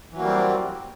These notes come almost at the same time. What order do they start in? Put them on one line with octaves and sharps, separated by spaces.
E3 F#3 A#3 G3 C4